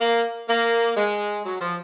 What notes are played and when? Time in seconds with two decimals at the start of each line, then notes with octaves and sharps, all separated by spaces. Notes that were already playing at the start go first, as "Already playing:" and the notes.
0.01 A#3
0.48 A#3
0.96 G#3
1.45 F#3
1.61 F3